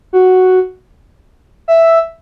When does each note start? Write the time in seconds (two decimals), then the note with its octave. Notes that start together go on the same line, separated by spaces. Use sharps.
0.13 F#4
1.68 E5